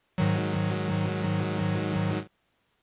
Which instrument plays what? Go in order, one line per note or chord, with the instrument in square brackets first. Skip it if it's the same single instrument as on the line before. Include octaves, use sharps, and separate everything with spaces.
[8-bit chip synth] G#2 D#3 F#3